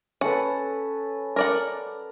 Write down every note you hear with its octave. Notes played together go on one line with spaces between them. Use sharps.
C#4 A4 B4 F#5
A#4 D5 F#5